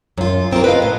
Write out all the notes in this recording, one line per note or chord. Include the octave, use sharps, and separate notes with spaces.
F#2 F4
F2 C4 C#4 F4 A#4
B4 D#5 F5
A2